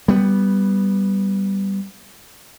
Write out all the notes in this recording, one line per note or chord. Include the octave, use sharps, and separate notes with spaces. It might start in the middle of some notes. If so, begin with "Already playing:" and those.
G3 B3